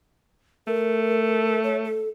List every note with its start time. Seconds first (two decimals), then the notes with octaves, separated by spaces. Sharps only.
0.67 A3 A#4
1.64 C#5
1.84 A4